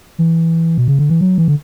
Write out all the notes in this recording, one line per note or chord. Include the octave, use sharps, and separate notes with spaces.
E3
B2
C#3
D3
E3
F#3
E3
D3